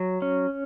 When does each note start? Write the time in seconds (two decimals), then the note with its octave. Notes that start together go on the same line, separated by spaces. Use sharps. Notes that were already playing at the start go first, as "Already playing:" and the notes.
Already playing: F#3
0.22 C#4